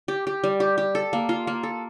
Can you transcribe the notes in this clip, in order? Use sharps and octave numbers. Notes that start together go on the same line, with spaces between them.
G4
G4
G3
G4
G4
A4
A#3
F4
A#3
A4